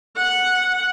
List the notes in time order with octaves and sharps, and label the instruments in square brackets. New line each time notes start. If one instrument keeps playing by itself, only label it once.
[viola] F#5